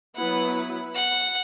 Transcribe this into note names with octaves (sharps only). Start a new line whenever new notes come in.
F#3 B3 E4 B4 F#5
F#5